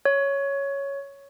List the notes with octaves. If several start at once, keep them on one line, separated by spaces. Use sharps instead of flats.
C#5